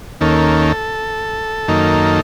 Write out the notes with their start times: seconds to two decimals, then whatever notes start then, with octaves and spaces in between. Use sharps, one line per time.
0.21 D#2 D#3 A#3 C#4 A4
1.68 F#2 D#3 A#3 D#4